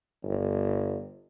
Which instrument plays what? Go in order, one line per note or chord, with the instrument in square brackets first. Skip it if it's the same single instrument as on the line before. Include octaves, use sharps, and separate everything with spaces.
[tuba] G1